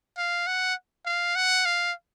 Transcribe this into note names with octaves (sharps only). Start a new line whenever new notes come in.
F5
F#5
F5
F#5
F5